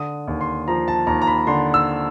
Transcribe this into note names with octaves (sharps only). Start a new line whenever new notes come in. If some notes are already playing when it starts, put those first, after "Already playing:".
Already playing: D3 D#6
D#2
C6
F3 A#5
A5
D#2 A#5
A#5
B5
D3 C6
E6